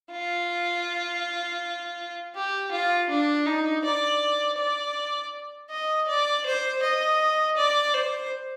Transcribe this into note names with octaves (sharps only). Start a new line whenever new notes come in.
F4
G4
F4
D4
D#4
D5
D5
D#5
D5
C5
D#5
D5
C5